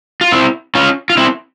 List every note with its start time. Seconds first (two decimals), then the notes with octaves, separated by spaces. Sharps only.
0.21 F4
0.32 C4 E4
0.75 C#4 F4
1.10 F4
1.17 C4 E4